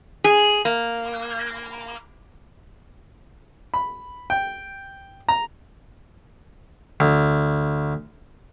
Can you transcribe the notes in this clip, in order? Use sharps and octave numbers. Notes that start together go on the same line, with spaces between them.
G#4
A#3
B5
G5
A#5
D2